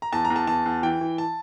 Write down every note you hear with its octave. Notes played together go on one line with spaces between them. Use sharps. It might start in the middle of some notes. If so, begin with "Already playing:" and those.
A#5
E2 A5
A#5
E2
A5
E2 A5
E2
E3 G5
E3
A5